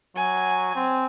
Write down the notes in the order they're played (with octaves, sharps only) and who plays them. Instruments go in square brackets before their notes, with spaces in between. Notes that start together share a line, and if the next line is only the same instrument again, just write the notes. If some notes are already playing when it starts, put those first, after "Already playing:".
[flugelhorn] F#3 [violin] G#5
[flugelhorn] C4